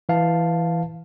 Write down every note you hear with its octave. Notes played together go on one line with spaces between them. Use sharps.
E3 F5 A5